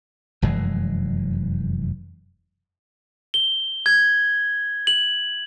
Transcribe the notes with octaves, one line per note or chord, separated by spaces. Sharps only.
F1 F#2 E3 G#3
G7
G#6
F#7